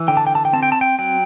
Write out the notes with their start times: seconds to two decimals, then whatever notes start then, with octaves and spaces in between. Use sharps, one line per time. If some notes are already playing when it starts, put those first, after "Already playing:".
Already playing: E3
0.08 D3 G5
0.17 A5
0.27 G5
0.35 A5
0.45 G5
0.53 C4 A5
0.63 G5
0.72 A5
0.81 G5
0.99 F#3 G5